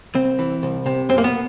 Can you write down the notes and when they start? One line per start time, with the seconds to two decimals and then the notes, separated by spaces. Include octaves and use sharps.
0.15 C2 C4
0.39 E3
0.63 C2
0.86 C3
1.09 F#2 C4
1.18 A#3
1.24 B3